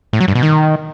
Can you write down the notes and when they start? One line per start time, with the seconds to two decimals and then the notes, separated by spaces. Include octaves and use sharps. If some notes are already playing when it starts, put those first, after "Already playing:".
0.13 A2
0.20 F#3
0.28 G2
0.35 B2
0.43 D#3